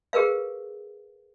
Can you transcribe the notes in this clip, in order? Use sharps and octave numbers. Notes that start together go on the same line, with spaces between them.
G4 G#4 A#4 B4 F5